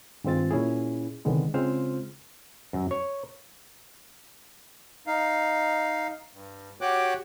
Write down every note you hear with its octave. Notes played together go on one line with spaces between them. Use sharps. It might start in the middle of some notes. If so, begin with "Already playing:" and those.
G2 D#3 G#3 C4 F4 A6
A#2 C#4 E4 G#4
C2 D3 D#3 G#3 B3
C#3 G#3 C4 F4 C5 F6
F#2
C#5
D#4 F5
G2
F#4 G4 C#5 G5 D6 F#6